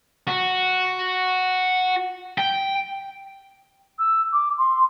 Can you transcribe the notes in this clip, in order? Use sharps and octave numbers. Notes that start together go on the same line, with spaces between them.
F#4
G5
E6
D6
C6